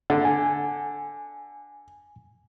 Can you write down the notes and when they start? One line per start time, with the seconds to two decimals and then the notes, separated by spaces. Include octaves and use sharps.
0.10 D3
0.25 G#5